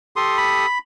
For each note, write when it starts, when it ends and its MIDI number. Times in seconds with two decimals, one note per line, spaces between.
0.16 0.66 67
0.16 0.66 69
0.16 0.37 84
0.16 0.66 87
0.37 0.78 83